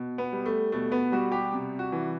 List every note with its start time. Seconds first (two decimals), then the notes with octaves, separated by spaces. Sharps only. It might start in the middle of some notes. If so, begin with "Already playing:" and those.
Already playing: B2
0.18 B3
0.32 G3
0.46 A3
0.72 B2 A3
0.92 B3
1.12 G3 F#4
1.32 G4
1.53 C3
1.79 F#4
1.92 E3